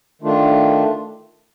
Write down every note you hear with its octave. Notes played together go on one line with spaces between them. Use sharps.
D#3 A3 D4 F4